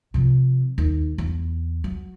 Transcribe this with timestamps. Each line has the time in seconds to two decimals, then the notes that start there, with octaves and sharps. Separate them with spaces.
0.14 C3 F3
0.78 D#2
1.18 E2
1.84 F#3